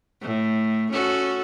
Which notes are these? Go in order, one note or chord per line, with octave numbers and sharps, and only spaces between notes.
A2
C#4 F#4 A4